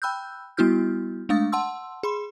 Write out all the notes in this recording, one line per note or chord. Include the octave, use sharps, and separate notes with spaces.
G5 B5 E6 F#6 G6
G3 B3 E4 F#4 F6 G6
G#3 A3 D4 F5 D#6 A6
F#5 A5 C6 E6
G#4 B5 C6